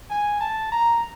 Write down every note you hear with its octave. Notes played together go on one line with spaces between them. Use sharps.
G#5
A5
A#5